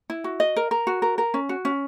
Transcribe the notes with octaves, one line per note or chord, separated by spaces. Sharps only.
E4
F#4
D#5
A#4
A#4
F#4
A#4
A#4
C#4
F#4
C#4